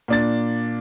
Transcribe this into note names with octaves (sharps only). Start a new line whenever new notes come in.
A#2 D4 A6